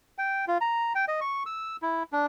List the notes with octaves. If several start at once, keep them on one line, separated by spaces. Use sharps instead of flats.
G5
F4
A#5
G5
D#5
C#6
E6
E4
D4